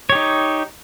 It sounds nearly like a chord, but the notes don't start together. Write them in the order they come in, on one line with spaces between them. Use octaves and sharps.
C#5 G4 D#4